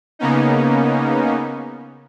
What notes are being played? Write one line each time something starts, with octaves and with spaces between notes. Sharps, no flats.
C#3 A#3 B3 C#4 D#4